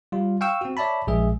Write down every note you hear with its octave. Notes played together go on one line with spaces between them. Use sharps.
G3 F4
F5 G5 C#6 E6
C4 F#4
C#5 D5 E5 A5 B5
A#1 G#3 G#4 E5